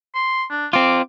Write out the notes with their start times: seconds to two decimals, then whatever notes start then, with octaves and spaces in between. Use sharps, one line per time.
0.15 C6
0.51 D4
0.73 C4 F4 D6